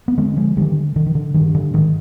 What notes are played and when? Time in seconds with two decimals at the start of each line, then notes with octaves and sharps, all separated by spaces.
0.08 B3
0.17 D3 G#3 C4
0.37 F3 G#3
0.57 D3 D#3 G3
0.96 D3 D#3
1.06 D#3
1.15 D3
1.34 G2 D#3
1.55 D3
1.73 G#2 D#3